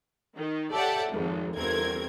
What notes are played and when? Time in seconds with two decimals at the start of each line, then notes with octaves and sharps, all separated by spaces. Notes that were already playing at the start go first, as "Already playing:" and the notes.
0.35 D#3
0.71 G4 A4 C#5 D5 E5 F#5
1.10 G#1 F2
1.56 G1 E2 C4 A#4 G#6